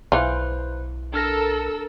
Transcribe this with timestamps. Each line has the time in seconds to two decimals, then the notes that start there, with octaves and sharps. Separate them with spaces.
0.12 B1 E3 F4 B4 C5
1.14 D4 A4 A#4 E6 F6 A#6